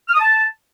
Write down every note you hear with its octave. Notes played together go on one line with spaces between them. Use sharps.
F6
D#6
A5